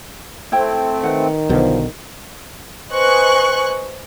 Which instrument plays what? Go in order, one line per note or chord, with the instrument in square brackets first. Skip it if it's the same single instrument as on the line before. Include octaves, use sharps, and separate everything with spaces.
[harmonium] A3 C4 [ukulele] E4 C5 G5
[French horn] D#3 [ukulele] B4 F#5
[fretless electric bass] B1 B2 D3 [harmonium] F3 [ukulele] C5
[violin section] B4 C5 D#5 G#5 C#6 F#6